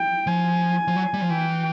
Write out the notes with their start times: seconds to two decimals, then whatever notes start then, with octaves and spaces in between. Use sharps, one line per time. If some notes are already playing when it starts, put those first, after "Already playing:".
Already playing: G5
0.27 F3 G#5
0.88 F3
0.96 F#3
1.14 G3
1.22 F3
1.30 E3 G5